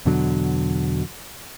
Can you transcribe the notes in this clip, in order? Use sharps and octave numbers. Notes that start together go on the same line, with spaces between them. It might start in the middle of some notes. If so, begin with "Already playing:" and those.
E2 B2 D3 F#3